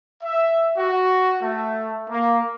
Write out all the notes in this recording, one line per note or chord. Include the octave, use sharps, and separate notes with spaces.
E5
F#4
A3
A#3